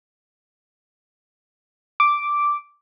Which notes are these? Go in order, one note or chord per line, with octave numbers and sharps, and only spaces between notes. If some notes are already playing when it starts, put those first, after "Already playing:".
D6